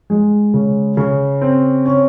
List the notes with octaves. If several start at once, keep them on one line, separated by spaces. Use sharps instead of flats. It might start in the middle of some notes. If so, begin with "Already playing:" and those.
G#3
C#3
C#3
C4
C#4